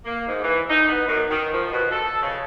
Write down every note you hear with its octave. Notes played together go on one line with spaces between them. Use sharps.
A#3
G#2
E3
D#4
B3
F#2
D#3
F3
B2
A4
C#3